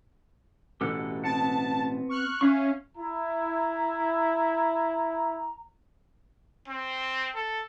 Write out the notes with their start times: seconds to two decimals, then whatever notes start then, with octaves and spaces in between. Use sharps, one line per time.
0.81 A1 B2 G4 A4 F#5
1.24 B3 C4 F#5 A5
2.09 C#6 F6 F#6
2.41 C#4 E5 F5 C#6
2.96 E4 A#5
6.68 C4
7.36 A4